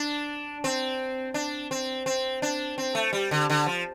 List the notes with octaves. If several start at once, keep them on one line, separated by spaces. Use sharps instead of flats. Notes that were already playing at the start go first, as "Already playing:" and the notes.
Already playing: D4
C4
D4
C4
C4
D4
C4
A3
G3
D3
D3
F3